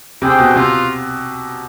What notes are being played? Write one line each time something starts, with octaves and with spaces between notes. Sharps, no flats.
C3 D4 G#4 C5 G5
B2
C3 F4